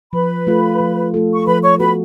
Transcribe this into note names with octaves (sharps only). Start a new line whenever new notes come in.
F3 B4 B5
A3 F4 A4
F3
A3 F4 A4
C#6
F3 B4 B5
C#5 C#6
B3 F#4 A4 B4 B5